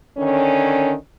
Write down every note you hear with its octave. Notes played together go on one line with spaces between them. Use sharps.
D3 D#3 C#4